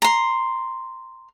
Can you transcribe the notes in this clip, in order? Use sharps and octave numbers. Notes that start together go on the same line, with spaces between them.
A#5 C6